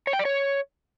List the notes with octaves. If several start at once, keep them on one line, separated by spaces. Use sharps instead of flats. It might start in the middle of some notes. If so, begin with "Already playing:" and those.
C#5
G5
D5
C#5